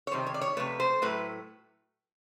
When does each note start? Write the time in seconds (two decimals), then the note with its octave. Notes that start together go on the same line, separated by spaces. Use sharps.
0.07 C#5
0.11 C3 D#3 G3 C5
0.27 C#5
0.34 D5
0.41 C#5
0.57 C3 F3 A3 B4
0.80 C5
1.02 A2 F#3 A3 B4